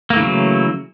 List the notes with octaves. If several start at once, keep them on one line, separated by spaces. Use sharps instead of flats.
C#3 E3 F#3 A3 A#3